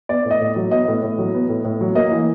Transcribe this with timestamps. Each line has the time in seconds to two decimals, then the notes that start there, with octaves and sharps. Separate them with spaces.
0.09 B3 D5
0.25 A2
0.31 D#5
0.40 A2
0.56 F#3
0.71 B3 D#5
0.88 A2
1.03 A2
1.19 F#3
1.34 B3
1.49 A2
1.64 A2
1.81 F#3
1.95 A#3 D#5
2.11 E3